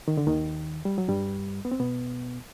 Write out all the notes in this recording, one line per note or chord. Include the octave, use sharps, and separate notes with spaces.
D#3
D3
D#2 D#3
G3
F#3
G2 G3
B3
C4
B2 B3